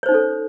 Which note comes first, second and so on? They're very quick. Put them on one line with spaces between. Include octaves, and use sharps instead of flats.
C#5 C5 D#4 C#4 A4